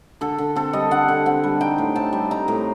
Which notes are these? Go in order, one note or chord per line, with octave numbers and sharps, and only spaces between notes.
D3 A4
D3
C4 A4
G3 D#5
D3 F#5
D3
C4 F#5
G3
D#4 G5
A2
C4 A5
G3
D#4 A#5
A2